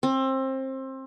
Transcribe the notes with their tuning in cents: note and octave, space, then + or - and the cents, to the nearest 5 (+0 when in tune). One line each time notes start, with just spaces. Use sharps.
C4 +25